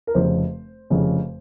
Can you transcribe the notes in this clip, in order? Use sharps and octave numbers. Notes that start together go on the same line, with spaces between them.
A#4
F1 F2 C#3 C5
F1 F2 C#3